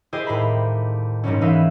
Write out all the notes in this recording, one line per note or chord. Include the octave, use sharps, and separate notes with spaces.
E4 G4 G#4 C5 D#5 G5
D#2 A2 C5 A#5 B5
G#2 F#3 G3 C#4
G#2 E3 D#4 B4 E5 F5